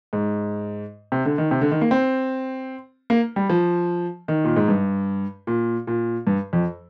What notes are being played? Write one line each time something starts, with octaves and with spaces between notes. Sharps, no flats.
G#2
C3
D3
D#3
C3
D3
D#3
A#3
C4
A#3
G3
F3
D#3
A#2
G#2
G2
A#2
A#2
G2
F2